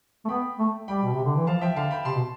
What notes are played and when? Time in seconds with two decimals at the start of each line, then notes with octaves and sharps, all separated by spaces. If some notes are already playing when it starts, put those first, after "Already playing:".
0.25 A3
0.29 B3 G5 B5
0.59 A3
0.88 G3 G5 B5
1.03 B2
1.14 C3
1.24 D3
1.36 E3
1.47 F3 F5 A5
1.61 F3 E5 G5
1.76 D3 F5 A5
1.91 G5 B5
2.05 C3 A5 C6
2.15 B2